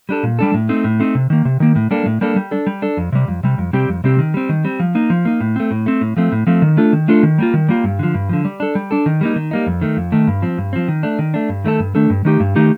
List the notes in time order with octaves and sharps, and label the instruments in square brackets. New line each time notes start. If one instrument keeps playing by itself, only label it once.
[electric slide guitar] G3 D4 A4
A#2
G3 D4 A4
A2
A3 C4 D#4
A2
A3 C4 D#4
C3
D#3 A#3
C3
D#3 A#3
A2
G3 A#3 D4 A4
A2
G3 A#3 D4 A4
G3
D4 A4
G3
D4 A4
F2
C3 G3
F2
C3 G3
F2
C3 G3 C4 G4
F2
C3 G3 C4 G4
D#3
G3 C4
D#3
G3 C4
F3
A#3 D#4
F3
A#3 D#4
A2
A3 C4
A2
A3 C4
A2
F3 A3 C4
A2
F3 A3 C4
D#3
A3 D4 F4 A4
D#3
A3 D4 F4 A4
D#3
G3 A#3 F4
D#3
G3 A#3 F4
G2
D3 F3
G2
D3 F3
G3
D4 A4
G3
D4 A4
D#3
G3 A#3 D#4
D#3
G3 A#3 D#4
F2
D#3 A3
F2
D#3 A3
G2
F3 C4
G2
F3 C4
D#3
A3 D4
D#3
A3 D4
G2
D#3 A3 D4 A4
G2
D#3 A3 D4 A4
G2
D#3 A3 D#4 G4
G2
D#3 A3 D#4 G4